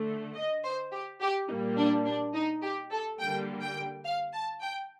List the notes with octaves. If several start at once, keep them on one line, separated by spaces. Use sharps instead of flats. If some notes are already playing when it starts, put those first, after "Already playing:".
Already playing: D3 A3
D#5
C5
G4
G4
A#2 G3 A#3 D#4
D4
D4
D#4
G4
A4
D3 G3 A#3 G5
G5
F5
A5
G5